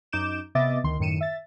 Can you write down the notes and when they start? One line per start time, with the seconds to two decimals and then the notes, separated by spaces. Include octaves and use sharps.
0.13 F#2 D#4 D6 G6 D7 E7
0.55 C3 B3 D#5 E5 D6 A6
0.84 D2 D#3 C6
0.99 F#2 A2 D#3 C#7 D#7 E7
1.21 E5 A6